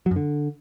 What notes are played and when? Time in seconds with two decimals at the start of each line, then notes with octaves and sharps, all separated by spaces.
0.06 F#3
0.11 F#2
0.16 D3